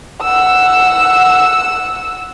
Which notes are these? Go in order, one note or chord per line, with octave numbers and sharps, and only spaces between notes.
F#5 E6